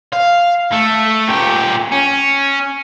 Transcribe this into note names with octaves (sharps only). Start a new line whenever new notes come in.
F5
A3
A#2 G4
C#4